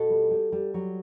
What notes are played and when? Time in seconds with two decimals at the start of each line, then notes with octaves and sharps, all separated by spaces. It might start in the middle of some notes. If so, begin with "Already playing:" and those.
Already playing: B2 F#4 A4
0.10 G3
0.31 G3
0.52 G3
0.74 F#3